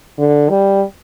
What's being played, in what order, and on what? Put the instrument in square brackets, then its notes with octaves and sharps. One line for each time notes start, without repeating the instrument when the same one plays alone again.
[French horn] D3
G3